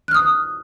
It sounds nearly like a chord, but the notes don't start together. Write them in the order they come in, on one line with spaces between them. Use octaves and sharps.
F#6 F6 D#6